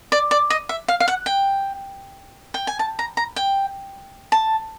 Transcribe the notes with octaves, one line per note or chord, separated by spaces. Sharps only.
D5
D5
D#5
E5
F5
F5
F#5
G5
G5
G#5
A5
A#5
A#5
G5
A5